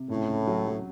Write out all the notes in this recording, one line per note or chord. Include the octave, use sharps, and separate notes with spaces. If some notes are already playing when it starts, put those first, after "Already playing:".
Already playing: C3
C#2 A2
C#2
F#3
F#3